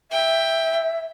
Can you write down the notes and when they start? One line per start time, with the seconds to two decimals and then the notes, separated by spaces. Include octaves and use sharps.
0.12 E5 G5